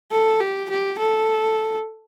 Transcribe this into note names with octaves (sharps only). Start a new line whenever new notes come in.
A4
G4
G4
A4